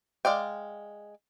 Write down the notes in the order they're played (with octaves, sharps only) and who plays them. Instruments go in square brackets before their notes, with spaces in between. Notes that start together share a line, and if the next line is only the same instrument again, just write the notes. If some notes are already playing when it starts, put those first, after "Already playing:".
[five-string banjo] G#3 D5 F5 G5